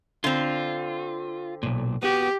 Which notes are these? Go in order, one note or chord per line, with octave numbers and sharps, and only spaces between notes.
D3 C4 F4
B1 A#2
B3 F#4 G4